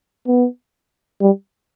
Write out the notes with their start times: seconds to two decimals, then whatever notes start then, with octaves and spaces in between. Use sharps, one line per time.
0.27 B3
1.21 G3